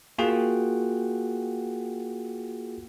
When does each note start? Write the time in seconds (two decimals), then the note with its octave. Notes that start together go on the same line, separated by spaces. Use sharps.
0.18 A#3 F4 F#4 G#4 F#5 G5